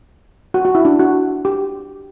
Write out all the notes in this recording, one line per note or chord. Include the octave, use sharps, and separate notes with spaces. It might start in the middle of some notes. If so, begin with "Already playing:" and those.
F#4
F#4
E4
D4
F#4
G4